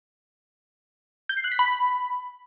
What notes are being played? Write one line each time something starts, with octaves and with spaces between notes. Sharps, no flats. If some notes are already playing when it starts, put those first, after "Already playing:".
G6
C7
F#6
B6
B5